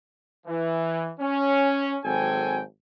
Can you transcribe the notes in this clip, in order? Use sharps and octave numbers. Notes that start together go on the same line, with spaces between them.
E3
C#4
G#1 F#3 C4 A4 G5 G#5